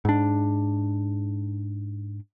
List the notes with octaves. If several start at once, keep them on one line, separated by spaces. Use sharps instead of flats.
G#2 D4